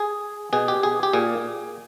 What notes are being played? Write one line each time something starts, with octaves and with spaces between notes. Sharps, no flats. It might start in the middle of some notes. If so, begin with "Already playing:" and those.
Already playing: G#4
B2 G#4
G4
G#4
G4
A#2 G#4